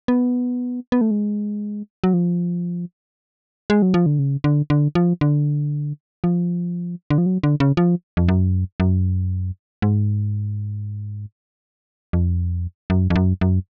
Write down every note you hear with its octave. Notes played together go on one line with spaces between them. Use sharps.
B3
B3
A3
G#3
F#3
F3
G#3
F#3
F3
D3
C#3
D3
D3
F3
D3
F3
D3
F3
F#3
D3
C#3
F3
F2
F#2
F#2
G#2
F2
F#2
F2
F#2
F#2